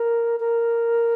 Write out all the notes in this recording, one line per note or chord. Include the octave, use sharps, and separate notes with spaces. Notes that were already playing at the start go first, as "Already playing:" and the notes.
Already playing: A#4
A#4